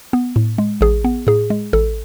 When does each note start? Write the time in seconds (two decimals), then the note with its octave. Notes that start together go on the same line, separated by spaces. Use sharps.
0.13 B3
0.36 A2
0.58 G#3
0.81 A1 G#4
1.05 B3
1.27 A2 G#4
1.50 G#3
1.73 A1 A4